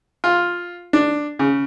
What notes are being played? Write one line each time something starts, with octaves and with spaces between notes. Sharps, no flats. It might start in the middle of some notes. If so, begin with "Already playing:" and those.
F4
D4
C#3